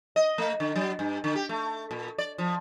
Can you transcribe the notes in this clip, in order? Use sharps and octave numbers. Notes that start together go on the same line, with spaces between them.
D#5
A3
D3
F#3
G2
D3
G4
A3
A#2
D5
F3